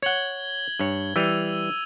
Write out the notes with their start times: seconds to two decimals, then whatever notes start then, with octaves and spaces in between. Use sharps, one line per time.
0.02 C#5 F#5 G#6 F#7 G7
0.80 G2 C#5
1.16 E3 G3 E6 D#7 F7